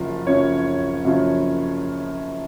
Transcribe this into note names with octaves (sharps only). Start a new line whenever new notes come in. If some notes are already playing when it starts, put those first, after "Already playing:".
Already playing: F#1 F#2 F3
F#1 F#2 F3 C#5
F#1 F#2 F3